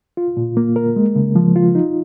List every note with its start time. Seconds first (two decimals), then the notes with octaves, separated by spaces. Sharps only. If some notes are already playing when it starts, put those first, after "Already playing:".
0.17 F4
0.37 A#2
0.57 A#3
0.76 A#4
0.96 G#3
1.16 C#3
1.36 F3
1.56 F4
1.75 D#4